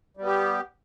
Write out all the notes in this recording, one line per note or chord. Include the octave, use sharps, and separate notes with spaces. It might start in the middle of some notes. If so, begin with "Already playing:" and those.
G3 B3 G4